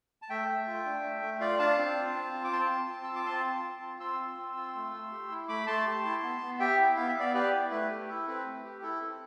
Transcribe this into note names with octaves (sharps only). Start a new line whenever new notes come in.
A5
A3 E5 G5
A3
F4
D4
A3
A3
F4 D5 F5
D4 F5 A5
C4
F4
C4
F4
D6
C4 A5 C6
F4
C4
F4 E6
D6
C4 A5 C6
F4
C4
F4
C4 C6 E6
F4
C4
F4
A3
A3
G4
E4
A3 B5 D6
A3 A5 C6
G4
E4
B3
B3
G4 E5 G5
E4
B3 F5
E5
B3 D5 F5
G4 B4 D5
E4
A3 B4
G4
E4 A4
C4 B4
A3
G4
E4 A4
C4